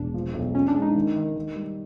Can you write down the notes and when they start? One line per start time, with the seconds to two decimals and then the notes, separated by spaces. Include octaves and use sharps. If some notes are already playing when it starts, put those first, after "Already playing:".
Already playing: E1 D4
0.14 F3
0.34 B1
0.54 F3 C#4
0.68 D4
0.74 G#3
0.82 D#4
0.95 D#3
1.16 D#3
1.36 D#3
1.56 G3